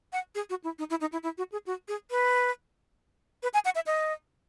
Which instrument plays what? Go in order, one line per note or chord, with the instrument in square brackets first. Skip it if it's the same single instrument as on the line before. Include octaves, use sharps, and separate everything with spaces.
[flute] F#5
G#4
F#4
E4
D#4
E4
D#4
E4
E4
F#4
G#4
F#4
G#4
B4
B4
G#5
F#5
E5
D#5